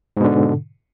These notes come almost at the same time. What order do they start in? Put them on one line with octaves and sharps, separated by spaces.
G#2 B2 D3